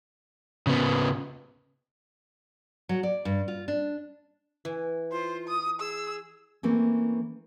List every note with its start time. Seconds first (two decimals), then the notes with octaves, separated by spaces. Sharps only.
0.67 C#3 B3
2.89 F#3
3.03 D5
3.25 G2
3.48 F4
3.68 D4
4.65 E3
5.12 F4 C5
5.48 D#6
5.80 G#4 E6
6.63 E3 A3 A#3 C4 C#4